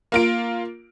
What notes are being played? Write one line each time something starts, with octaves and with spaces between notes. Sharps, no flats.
A#3 F4 D7